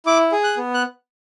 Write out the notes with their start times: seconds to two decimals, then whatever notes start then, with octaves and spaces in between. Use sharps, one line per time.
0.06 E4 D6
0.32 G#4
0.44 F#6
0.57 B3
0.74 F#6